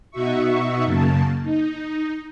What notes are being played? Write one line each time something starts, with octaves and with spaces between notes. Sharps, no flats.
B2 D#4 F#4 E5 C#6
F#2 C#3 A#3 A5
D#4